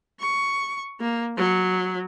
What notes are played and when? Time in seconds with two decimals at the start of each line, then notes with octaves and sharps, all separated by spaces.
0.19 C#6
1.00 A#3
1.37 F#3